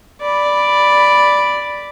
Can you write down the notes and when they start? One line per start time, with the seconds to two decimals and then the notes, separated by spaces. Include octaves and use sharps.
0.21 D5 B5